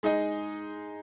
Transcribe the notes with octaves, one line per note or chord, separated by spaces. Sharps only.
G#3 D#4 G#4 D#5